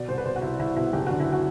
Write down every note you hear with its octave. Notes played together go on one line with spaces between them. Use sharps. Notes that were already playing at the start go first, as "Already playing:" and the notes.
Already playing: B2 D5
C2 C5
B4
B2 C5
F#4
C2 E4
C2 E4
B2 E4
F#1 G4
D3 F#4
E4
F#4